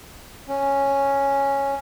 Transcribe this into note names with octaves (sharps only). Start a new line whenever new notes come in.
C#4